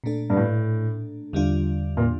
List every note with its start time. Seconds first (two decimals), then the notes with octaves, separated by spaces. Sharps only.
0.04 A#2 A3 D4 A4
0.30 G2
0.37 A2
1.33 E2 D3 G3 D4 F4
1.97 A#2